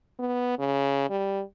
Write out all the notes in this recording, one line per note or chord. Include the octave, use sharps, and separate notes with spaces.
B3
C#3
G3